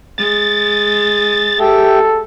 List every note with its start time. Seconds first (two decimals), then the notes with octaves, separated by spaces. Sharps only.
0.18 G#3 A6
1.60 G4 A4 E5 G5